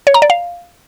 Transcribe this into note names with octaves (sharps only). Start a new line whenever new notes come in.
C#5
A#5
D5
F5